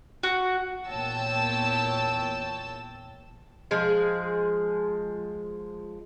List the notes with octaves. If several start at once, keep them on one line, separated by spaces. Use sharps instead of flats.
F#4
E2 A#2 C#5 G5 A5 E6
F3 G#3 G#4